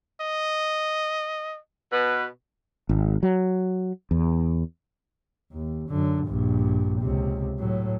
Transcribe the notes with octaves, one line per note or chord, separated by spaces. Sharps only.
D#5
B2 B4
G#1
F#3
E2
D#2
F#2 D3
A#1 G2
C#2 C3
A2 F#3